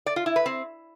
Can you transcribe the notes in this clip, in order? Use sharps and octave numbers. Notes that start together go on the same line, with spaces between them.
D5
F4
E4
B4
C4